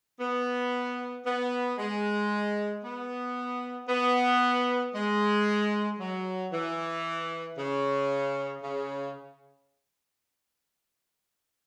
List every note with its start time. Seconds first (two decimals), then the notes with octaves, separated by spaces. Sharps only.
0.20 B3
1.25 B3
1.78 G#3
2.83 B3
3.89 B3
4.94 G#3
5.99 F#3
6.52 E3
7.57 C#3
8.63 C#3